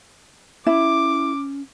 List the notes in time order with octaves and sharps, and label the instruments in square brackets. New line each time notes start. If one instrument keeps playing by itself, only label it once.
[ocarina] C#4 [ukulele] E4 [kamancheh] D6